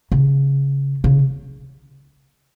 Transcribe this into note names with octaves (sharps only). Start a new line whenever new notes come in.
C#3
C#3